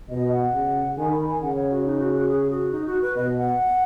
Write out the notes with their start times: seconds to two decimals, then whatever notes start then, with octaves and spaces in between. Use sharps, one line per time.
0.09 B2 D#5
0.32 F#5
0.53 C#3
0.97 D#3 G#5
1.11 B5
1.27 G#5
1.41 C#3 F#5
1.55 C#5
1.70 F#4
1.85 D#4
1.99 F#4
2.14 F#4
2.28 G#4
2.50 F#4
2.72 D#4
2.86 F#4
3.02 B4
3.16 B2 D#5
3.38 F#5